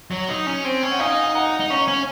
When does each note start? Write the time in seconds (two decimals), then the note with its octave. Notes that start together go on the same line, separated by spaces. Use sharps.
0.11 F#3
0.29 D#4
0.47 C#4
0.65 C4
0.83 C#4
0.91 F#5
0.99 D#4 F5 G#5
1.24 G#5
1.35 F#5 A#5
1.60 D#4
1.70 C#4 A#5 C#6
1.88 C#4